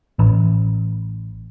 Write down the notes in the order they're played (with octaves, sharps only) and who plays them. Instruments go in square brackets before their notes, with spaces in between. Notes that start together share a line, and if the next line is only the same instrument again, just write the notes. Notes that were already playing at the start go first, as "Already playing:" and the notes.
[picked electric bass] A1